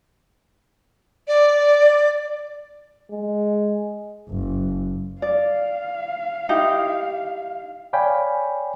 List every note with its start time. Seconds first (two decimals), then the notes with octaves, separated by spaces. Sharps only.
1.28 D5
3.12 G#3
4.29 F#1
5.22 D5 F5
6.49 D#4 E4 G4
7.93 C#5 D5 F5 G5 G#5 B5